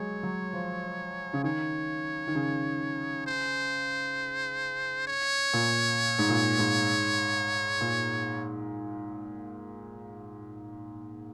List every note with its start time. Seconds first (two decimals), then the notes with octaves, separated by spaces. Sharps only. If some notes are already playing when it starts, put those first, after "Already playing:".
Already playing: F#3 G#3 C#5
0.23 F#3
0.53 F3
1.33 C#3
1.44 D#3 C#5
2.28 D#3
2.35 C#3
3.27 C5
5.07 C#5
5.53 A#2
6.19 G#2
6.29 A#2
6.59 G#2
7.81 A#2